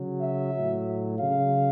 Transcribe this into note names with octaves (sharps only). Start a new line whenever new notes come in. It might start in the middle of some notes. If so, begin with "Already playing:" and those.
Already playing: C#3 F#3
E5
A2 F#3
C#3 F#3 F5